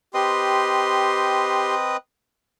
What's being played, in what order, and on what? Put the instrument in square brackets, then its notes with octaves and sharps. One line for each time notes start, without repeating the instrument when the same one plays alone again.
[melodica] C4 B4 D#5 [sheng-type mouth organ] G4 C6